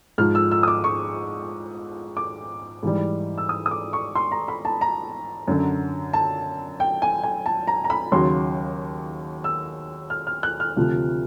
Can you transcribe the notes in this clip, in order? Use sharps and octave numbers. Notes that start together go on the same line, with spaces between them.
G#2 F3 F6
E6
E6
D#6
D6
C#6
D6
G#2 E3 G3
E6
D#6
D#6
D6
C#6
C6
A#5
B5
A5
A#5
F#2 D3 F#3
A5
G5
G#5
G#5
A5
A#5
A#5
B5
D#2 C#3 F#3 C6
E6
F6
F6
F#6
F6
D2 C3 F3